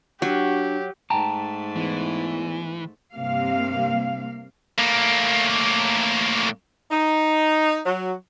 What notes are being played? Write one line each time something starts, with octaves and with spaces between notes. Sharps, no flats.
F#3 D4 F#4 G4
G#2 A3 G5 A5 A#5
E2 E3
G2 C3 A#3 F5
A2 A#3
D#4
F#3